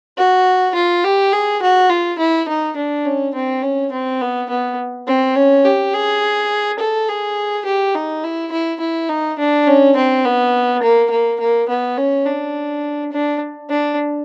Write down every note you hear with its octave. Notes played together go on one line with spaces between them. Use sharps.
F#4
F4
G4
G#4
F#4
F4
E4
D#4
D4
C#4
C4
C#4
C4
B3
B3
C4
C#4
G4
G#4
A4
G#4
G4
D#4
E4
E4
E4
D#4
D4
C#4
C4
B3
A#3
A#3
A#3
B3
C#4
D4
D4
D4